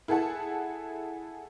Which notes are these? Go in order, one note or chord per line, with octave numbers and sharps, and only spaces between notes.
E4 G#4 A4 F#5 A5